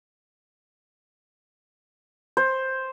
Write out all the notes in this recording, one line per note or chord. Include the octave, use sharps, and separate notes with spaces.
C5